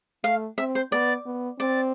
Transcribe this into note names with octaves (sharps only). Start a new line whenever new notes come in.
A3 F5
C4 E5
C5
B3 D5
B3
C4 D5